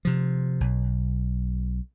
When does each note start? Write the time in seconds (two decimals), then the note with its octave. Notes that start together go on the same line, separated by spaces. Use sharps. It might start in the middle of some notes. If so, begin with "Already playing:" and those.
0.05 C3 F3
0.61 B1